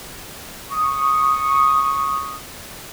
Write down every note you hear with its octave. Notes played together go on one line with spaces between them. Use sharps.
C#6 D#6